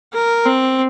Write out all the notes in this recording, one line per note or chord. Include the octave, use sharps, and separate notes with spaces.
A#4
C4